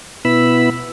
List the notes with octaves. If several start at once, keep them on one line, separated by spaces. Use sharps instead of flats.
B2 B3 E4 B5 E6